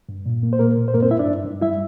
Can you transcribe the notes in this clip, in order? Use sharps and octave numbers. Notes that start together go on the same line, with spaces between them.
G2
A#2
A#3
C5
A#2 A#3 A#4
A#2
C5
G2 A#3 A#4
C4 C5
G2 E4 E5
D4 D5
G2
G2
G3 E4 E5